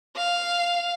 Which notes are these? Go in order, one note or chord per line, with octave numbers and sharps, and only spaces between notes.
F5